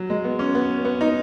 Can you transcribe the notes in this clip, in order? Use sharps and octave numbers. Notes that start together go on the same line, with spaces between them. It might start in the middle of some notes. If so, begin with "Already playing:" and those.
Already playing: F#3
G#3
B3
C#4
B3
B3
D#4